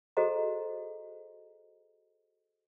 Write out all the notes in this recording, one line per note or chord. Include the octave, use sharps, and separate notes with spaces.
F#4 G#4 A4 C5 D#5 A#5